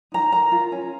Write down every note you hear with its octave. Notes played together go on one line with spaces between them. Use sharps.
D#4 A#5
A#4 A#5
F4
C#4